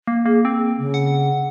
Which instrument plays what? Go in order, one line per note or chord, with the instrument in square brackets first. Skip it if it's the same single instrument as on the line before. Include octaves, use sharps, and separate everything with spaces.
[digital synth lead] A#3
[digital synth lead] A#3 [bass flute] G#4
[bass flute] A#3 [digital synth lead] C4
[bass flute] C#3
[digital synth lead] F#5